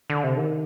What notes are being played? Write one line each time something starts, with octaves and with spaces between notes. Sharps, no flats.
D3
C3
D#3